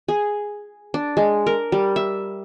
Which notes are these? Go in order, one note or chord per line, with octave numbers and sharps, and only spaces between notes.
G#4
D4
G#3
A#4
G3
E5